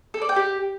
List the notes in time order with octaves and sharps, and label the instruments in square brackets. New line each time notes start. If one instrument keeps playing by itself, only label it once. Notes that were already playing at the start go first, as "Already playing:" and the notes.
[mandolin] A4
D5
G5
G4